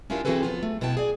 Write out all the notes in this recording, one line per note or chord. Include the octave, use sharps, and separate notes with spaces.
C#4 D4 E4 F4 G4 A#4
E3 C4 F#4 G#4 A4 B4
F3 B3 F4
A3
B2 B3 E4 F#4 G5 A5
G#4 D5